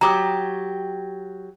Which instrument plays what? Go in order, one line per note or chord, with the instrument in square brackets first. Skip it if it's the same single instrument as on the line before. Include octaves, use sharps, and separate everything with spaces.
[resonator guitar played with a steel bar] F#3 G4 [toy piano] A#5 D6 D#6